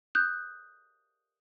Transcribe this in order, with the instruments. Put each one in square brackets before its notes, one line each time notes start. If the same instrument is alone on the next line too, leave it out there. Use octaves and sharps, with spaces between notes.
[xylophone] D#6 F#6 G6